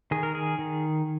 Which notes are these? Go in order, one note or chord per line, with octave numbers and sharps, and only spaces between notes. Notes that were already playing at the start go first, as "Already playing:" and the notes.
D#3 G#4
A#4
G#4
D#3